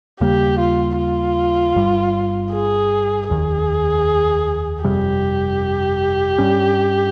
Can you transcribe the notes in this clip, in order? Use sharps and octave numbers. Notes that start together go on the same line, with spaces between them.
D#2 C#3 G3 A#3 G4
F4
F4
G1 G2 G3
G#4
F1 D#2 D#3 G#4
G1 F2 C3 G3 G4
G2 G3 C#4